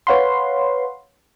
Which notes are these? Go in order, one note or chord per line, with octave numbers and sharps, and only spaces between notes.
B4 C#5 F5 F#5 B5 C6